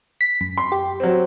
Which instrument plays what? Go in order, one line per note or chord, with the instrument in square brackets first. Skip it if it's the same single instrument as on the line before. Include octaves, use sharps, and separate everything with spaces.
[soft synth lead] B6
F#2
[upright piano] C6
[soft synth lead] G4
[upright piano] F#3 C4